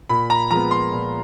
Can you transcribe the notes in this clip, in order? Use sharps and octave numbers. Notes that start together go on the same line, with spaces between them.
A#2 B5
A#5
F3 G#3 B3 A#5
C6
A#2